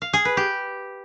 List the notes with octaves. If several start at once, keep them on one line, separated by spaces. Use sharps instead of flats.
F5
G#4
B4
G4